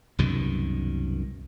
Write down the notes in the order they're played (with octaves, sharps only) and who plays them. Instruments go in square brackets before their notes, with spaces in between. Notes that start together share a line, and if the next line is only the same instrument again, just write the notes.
[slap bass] C2 F#2 B2 D#3